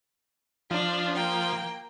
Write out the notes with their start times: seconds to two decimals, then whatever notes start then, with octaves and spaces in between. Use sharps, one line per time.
0.71 F3 D4
1.15 A#3 G5